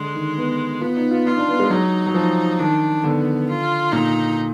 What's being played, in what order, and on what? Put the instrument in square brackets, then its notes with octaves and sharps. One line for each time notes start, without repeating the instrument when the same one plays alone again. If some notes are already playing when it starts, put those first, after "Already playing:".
Already playing: [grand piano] D3 [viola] G#3
[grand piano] D#3
B3
[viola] B3 [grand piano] F4
[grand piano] D#4
F4
[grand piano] D#4 [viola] F4
[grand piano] D4
B3
G#3
[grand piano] F#3 [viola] D#4
[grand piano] F#3
F3
[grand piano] D#3 [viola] D4
[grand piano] D3 [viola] B3
[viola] F4
[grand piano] A#2 [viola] D#4